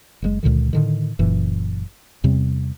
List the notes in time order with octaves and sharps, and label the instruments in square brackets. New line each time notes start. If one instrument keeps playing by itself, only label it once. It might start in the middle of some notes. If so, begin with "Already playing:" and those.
[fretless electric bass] F#1 A2 G#3
C#2 A#2 D3 D#3
A2 D3 D#3
F#1 F#2 A#2 E3
E2 C3 G3 C4